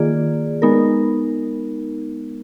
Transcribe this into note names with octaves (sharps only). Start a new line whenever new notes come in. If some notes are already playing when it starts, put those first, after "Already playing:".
Already playing: D#3 A#3 F4 G#4 D5
G#3 B3 D#4 A#4